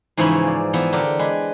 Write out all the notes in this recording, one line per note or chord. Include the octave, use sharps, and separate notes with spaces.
G#2 C#3 E3 F3 C#4 B5
D5
E3 F3 B3
D3 D4 G4 A#4
G#3 B4